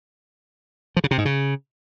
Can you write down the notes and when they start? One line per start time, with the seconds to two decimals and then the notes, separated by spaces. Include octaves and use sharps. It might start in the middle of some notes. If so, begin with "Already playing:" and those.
0.97 F3
1.04 C#3
1.11 C3
1.18 G#2
1.25 C#3